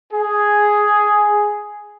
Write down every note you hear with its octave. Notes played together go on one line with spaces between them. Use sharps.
G#4